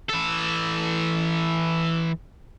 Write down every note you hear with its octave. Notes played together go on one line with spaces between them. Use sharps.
E3 A4